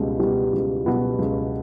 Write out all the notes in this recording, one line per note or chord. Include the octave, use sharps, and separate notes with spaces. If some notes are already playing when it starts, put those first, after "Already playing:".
Already playing: C#2 B2 G3
B2 G3 B3
C#2
B2 G3 B3
C#2